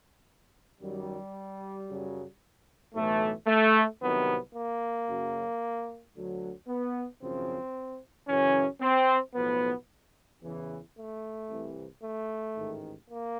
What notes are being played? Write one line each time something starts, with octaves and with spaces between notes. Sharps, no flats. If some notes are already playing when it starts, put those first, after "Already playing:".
F#2 D#3 F#3 G3
F#2 C#3 F#3
B1 A2 E3 A3
A3
C2 C3 D#3 F#3 B3
A#3
F#2 C#3 F#3
D2 D3 F#3
B3
G#1 F#2 C#3 F3 C4
F#2 C#3 E3 C#4
C4
B1 A2 F3 B3
E2 C#3 E3
A3
C2 C3 E3
A3
A1 G#2 D#3
A#3